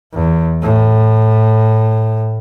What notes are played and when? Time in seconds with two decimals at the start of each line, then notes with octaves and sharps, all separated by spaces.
0.14 E2
0.62 A2